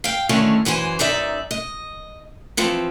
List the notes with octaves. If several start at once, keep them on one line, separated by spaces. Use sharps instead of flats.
F5 G5
D3 D#3 A3 C#4 E4 G#5
F#2 E3 C5 G#5
F#2 D#4 D5 E5
D#5
E3 F3 C4